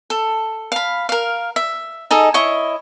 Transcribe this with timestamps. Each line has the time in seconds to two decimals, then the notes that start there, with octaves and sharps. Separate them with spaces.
0.10 A4
0.72 F5 B5
1.09 A#4 F5
1.56 E5
2.11 D#4 G#4 A4 D#5
2.34 E4 C#5 D#5 C#6